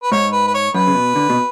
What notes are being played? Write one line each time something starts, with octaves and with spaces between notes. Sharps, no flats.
B4
G#2 C#5
B4
B4
C#5
F#2 B4
C#3
B2
D3
B2